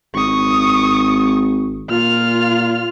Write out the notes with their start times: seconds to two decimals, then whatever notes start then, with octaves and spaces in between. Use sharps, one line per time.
0.14 G#1 C#6 D#6
1.90 A#2 F4 F6